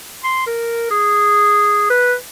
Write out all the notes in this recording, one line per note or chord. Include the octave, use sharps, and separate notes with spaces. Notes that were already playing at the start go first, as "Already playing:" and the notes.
C6
A#4
G#4
B4